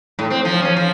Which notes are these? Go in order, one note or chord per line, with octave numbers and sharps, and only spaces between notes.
A2
C4
F3
C#4
F3